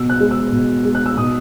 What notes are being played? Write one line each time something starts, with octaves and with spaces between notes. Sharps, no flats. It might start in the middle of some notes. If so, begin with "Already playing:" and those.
Already playing: B2 E6
F#6
G#3
E6
B2
G#3
F#6
E6
B2 D#6